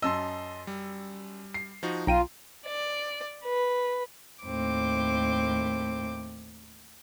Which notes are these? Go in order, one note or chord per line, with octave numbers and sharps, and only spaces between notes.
F#2 D#5 A5 C6 E6
G3
C7
F3 D#4 F#4
B1 F4 G5 A#5 D#7
D5
B4
D#2 A2 C4 D6